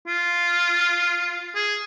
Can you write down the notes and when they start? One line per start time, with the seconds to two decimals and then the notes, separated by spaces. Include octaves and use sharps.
0.07 F4
1.55 G#4